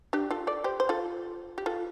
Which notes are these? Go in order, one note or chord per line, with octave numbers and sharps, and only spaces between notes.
D4 G4
F4 A4
A4 D5
G4 C5
C5
F4 A4
G4
F4 A4